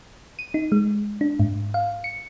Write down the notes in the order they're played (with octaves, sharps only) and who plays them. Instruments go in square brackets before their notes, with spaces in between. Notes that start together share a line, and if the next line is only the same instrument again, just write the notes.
[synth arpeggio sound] D#7
D#4
G#3
D4
G#2
F5
C#7